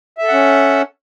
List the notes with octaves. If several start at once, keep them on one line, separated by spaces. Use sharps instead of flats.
C#4 A4 E5 F#5